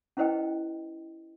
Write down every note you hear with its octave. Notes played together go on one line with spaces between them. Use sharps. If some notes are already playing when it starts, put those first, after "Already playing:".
C#4 E4 B4 C5 D#5 G5